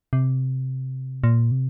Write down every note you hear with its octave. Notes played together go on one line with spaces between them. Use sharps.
C3
A#2
C3